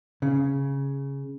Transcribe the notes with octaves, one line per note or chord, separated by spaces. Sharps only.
C#3